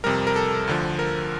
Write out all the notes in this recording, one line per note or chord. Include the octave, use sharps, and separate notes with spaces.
F2 C3 G3 A#4
A#4
A4
D2 D3 F3
A#4